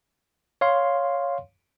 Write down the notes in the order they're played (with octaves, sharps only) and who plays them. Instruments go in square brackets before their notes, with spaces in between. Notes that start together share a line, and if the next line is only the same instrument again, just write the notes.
[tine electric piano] C#5 F5 C6